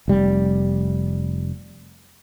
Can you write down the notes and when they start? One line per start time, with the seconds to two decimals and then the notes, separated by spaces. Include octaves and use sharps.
0.08 F1 G3